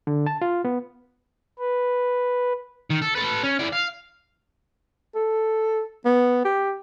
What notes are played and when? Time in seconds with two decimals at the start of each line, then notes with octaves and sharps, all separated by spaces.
0.07 D3
0.27 A5
0.42 F4
0.65 B3
1.59 B4
2.90 D#3
3.02 A4
3.16 A4 B4
3.44 C#4
3.59 E3 D5
3.73 F5
5.15 A4
6.06 B3
6.45 G4